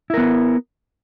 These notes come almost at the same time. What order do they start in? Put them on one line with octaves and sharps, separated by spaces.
E4 A#4 B3